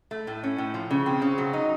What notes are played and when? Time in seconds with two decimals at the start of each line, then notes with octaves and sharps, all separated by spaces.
0.11 A3
0.27 A2
0.43 C#4
0.58 A2
0.74 F3
0.91 C#3
1.06 C4
1.22 C#3
1.38 F#3
1.53 D#4